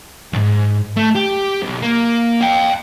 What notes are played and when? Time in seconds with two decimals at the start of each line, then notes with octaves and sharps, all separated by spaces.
0.33 E2 G#2
0.96 A3
1.15 G4
1.62 B1
1.82 A#3
2.41 F5 G5